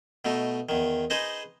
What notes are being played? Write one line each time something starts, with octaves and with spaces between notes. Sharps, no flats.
B2 A3 D#4
E2 D#3
D#4 G#4 B4 C5 D#5